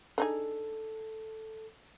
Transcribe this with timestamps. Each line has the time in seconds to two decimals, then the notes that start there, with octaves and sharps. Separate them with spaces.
0.18 D4 D#4 G#4 A4